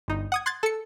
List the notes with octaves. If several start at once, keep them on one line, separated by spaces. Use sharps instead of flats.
G1 D#4
F#5 D#6 G#6
C6 F#6 G#6 A6
A4 C#7